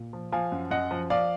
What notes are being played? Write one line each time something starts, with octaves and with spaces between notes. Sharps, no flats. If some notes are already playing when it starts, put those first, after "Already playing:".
Already playing: A#2
F3
F3 F5 G#5
F#2
F#2 D#5 F#5
F3
F3 D5 F5